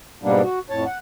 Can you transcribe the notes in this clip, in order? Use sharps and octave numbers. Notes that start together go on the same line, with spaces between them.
G#2 B2 G3 A#3 B3 D4
F#4
F2 A2 C#5 A5
F#5